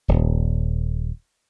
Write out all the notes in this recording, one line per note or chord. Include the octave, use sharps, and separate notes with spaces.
D#1